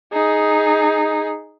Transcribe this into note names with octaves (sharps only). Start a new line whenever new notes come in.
D#4 G#4